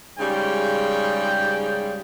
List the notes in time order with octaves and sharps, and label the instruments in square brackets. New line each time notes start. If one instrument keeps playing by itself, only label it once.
[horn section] G#2 C#3 G3 G5